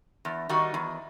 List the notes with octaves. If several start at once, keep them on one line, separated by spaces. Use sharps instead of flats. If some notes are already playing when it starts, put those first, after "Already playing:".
E2
D#3 G3 D#4 F#4
E2